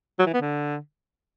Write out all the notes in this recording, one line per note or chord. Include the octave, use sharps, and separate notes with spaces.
F#3
E3
B3
D3